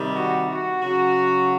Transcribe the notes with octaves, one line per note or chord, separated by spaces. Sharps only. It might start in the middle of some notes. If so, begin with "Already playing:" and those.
Already playing: C3 D#3 G3
F#4
F#4
C#3 F#3 F#4